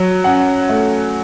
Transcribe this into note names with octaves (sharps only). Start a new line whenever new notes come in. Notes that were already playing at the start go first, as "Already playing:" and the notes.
Already playing: F#3
C#4 F#5
A3